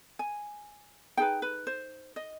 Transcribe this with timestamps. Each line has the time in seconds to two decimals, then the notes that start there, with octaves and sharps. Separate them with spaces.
0.19 G#5
1.17 D#4 G#4 B4 G5
1.42 B4
1.67 C5
2.16 D#5